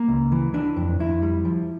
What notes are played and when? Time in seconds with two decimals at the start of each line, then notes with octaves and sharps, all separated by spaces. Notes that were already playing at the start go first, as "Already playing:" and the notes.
Already playing: A#3
0.08 C#2
0.32 E3
0.54 E3 D4
0.76 F2
0.99 F2 E4
1.22 G3
1.45 F3